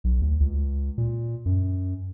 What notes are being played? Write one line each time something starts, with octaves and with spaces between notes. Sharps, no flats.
B1
D2
C#2
A#2
F#2